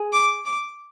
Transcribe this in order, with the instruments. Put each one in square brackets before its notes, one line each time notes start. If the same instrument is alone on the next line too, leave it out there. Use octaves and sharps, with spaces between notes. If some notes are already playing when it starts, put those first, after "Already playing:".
Already playing: [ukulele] G#4
[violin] D6
D6